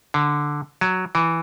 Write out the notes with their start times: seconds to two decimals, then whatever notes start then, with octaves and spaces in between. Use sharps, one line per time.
0.14 D3
0.81 F#3
1.15 E3